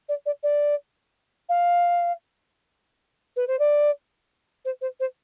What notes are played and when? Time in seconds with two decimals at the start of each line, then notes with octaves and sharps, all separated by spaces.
0.08 D5
0.26 D5
0.43 D5
1.49 F5
3.36 B4
3.47 C5
3.59 D5
4.65 C5
4.81 C5
5.00 C5